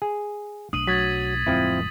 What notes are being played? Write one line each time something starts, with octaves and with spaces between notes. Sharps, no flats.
G#4
B1 A3 D4 D#6 D#7 F#7
F#3 G#6 A6 B6
D1 F2 F3 G#3 C4 E4